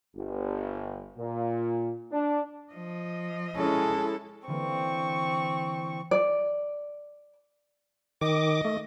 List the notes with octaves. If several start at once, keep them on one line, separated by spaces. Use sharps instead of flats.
G1
A#2
D4
F3 D#5
G#3 C#4 E4 A4
D3 E3 A#3 C4 C#6
D5
D#3 D#5 D6
A3